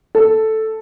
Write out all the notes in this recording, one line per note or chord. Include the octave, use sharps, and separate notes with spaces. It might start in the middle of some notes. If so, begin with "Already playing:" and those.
A4